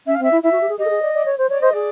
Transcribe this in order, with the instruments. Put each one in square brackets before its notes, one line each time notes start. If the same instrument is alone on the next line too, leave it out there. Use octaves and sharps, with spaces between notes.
[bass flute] C#4 [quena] E5
[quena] F5
[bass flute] C4 [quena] E5
[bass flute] E4
[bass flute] E4 [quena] E5
[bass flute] F#4
G4
G#4
[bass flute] G4 [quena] D#5
[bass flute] A4
G#4
D5
D5
C#5
C5
[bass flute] C#5 [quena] D5
[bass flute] C5 [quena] D#5
[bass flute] G#4 [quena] D5